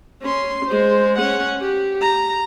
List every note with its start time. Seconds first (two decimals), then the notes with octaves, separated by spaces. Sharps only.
0.22 C#4 C6
0.66 G#3 C5
1.18 C#4 F#5
1.61 G4
2.01 A#5